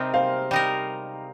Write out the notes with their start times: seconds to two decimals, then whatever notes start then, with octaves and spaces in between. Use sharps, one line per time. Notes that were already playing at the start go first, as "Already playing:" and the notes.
Already playing: C3 G3 C4 D#4 A#4 D#5
0.14 C5 F5
0.51 G3 D#4 A#4